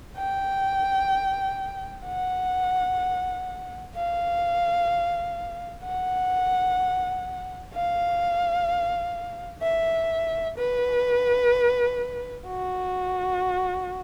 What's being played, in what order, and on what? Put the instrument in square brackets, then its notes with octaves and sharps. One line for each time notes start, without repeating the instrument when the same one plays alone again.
[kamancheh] G5
F#5
F5
F#5
F5
E5
B4
F#4